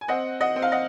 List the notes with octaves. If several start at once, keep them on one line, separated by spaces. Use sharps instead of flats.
G#5
C4 D#5 F#5
D#5 F#5
C4
F5
D#5 F#5